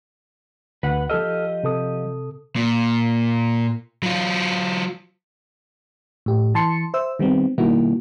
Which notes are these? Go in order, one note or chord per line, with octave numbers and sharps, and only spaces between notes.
D2 B4 F#5
F3 G4 A4 D#5 E6 F6
C3 A4 D#6
A#2
F#3 F4
A2 G4
E3 A5 C6 C#7
C5 E5 E6
D#3 G3 B3 C4
B2 D#3 G3 A#3 E4 F#4